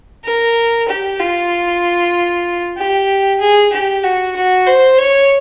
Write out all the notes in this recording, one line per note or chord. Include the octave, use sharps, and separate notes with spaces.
A#4
G4
F4
G4
G#4
G4
F#4
F#4
C5
C#5